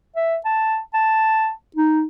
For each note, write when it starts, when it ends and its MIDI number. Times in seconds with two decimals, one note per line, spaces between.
0.16 0.38 76
0.45 0.79 81
0.94 1.51 81
1.76 2.04 63